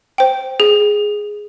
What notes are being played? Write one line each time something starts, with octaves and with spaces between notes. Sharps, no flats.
C5 G5
G#4